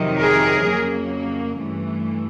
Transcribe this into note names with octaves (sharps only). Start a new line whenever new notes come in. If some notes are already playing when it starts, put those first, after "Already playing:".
Already playing: F2 C3 D#3 F#3
G#4 A#4
F2 C#3 F#3 A#3
G2 E3 A3